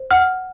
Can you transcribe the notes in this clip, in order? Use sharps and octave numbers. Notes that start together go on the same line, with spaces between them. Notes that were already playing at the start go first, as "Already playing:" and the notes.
Already playing: C5
F#5 F6